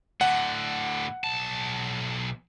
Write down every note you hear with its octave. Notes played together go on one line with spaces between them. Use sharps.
A2 D3 F#5
B1 A5